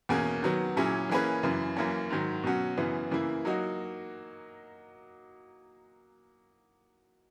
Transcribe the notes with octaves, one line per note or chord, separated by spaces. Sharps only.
E2 B2 A#3 C#4 G#4
D#3 F#3 B3
A#2 F#3 C#4 E4 G#4
E3 A#3 C#4 G#4 B4
F#2 C#3 E3
F#2 E3 A#3 C#4
G#2 D#3 F#3
B2 F#3 C#4 F#4
F#2 C#3 E3 B3
C#3 E3 A#3 E4
F#3 A#3 D#4 F#4